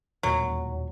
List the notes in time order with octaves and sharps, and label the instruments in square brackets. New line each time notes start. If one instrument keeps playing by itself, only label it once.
[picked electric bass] E1 D#2 A#2 [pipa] F#3